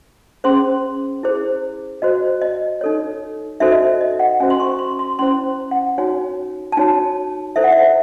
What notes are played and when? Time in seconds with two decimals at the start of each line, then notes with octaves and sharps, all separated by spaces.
0.44 C#4 G#4 C5 C6
1.23 E4 G#4 C5
2.02 F#4 C5 D#5
2.42 D#5
2.81 D#4 A4 C#5
3.60 D#4 F#4 A4 C5 E5
3.72 D#5
3.80 E5
4.01 D#5
4.19 F#5
4.40 C#4 F#4 C5 G#5
4.50 C6
4.60 C#6
4.79 C6
4.99 C6
5.19 C#4 E4 C5 C6
5.71 F#5
5.98 D#4 F#4 C#5 G#5
6.72 A5
6.77 D#4 F#4 C#5 G#5
7.56 E4 A4 C5 E5
7.64 F#5
7.72 E5